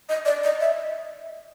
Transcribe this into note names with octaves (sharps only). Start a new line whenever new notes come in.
D#5
D5
D#5
E5